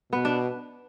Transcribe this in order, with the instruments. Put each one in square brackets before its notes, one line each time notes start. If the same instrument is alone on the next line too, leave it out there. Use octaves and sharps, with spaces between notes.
[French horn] B2 [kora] B3
[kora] D4